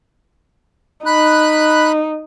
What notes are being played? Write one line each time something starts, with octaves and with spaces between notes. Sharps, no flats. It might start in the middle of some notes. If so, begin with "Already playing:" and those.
D#4 B5 F#6